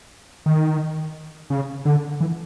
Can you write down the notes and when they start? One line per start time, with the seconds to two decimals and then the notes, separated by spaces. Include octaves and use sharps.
0.46 D#3
1.50 C#3
1.85 D3
2.20 E3